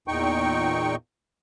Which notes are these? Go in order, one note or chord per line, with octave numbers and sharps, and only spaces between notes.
E2 A#2 D#4 G5 C#6